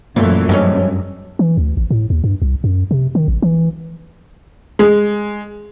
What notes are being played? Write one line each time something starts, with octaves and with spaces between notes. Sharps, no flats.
F#2 A#2 E3 A3
G2 E3 G#3 C#4
E3
D2
A1
A2
D#2
G2
C2
F#2
C3
D#3
A1
E3
G#3